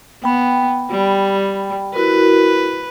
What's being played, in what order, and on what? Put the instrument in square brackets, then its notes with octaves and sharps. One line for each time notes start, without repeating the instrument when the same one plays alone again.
[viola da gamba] B3 [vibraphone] G5 B5
[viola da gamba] G3
[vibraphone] E4 F#4 A#4 [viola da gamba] B4